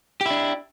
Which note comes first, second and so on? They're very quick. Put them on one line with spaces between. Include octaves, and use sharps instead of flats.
G4 E4 D4